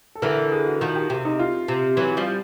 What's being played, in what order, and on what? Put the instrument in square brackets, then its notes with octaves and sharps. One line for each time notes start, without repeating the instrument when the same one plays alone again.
[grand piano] A4
[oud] D3 E3 [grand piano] A#4
[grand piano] A4
G#4
F#4
[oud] D#3 F3 [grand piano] F#4
[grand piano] G4
[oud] C3 [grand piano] G4
[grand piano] D#4
F4
[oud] C3
E3 F#3
F3 G3